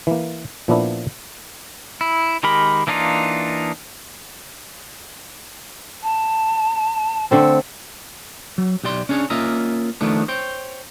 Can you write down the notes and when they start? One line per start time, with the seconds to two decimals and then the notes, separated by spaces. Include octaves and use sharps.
0.07 E3 A#3
0.68 A#2 F3 A#3 B3 D4 E4
2.01 E4
2.43 D#3 G#3 G4 A#4 B5
2.87 E3 A#3 D4 D#4 F4
6.03 A5
7.31 D3 A3 C4 E6
8.58 F#3
8.84 B1 G4 D5 C6
9.09 C#4 D4 G#4 C#5
9.30 A#3 C#4 F4 D#5 E5 A#5
10.01 D#3 F3 A3 B3 D4
10.28 C5 C#5 G5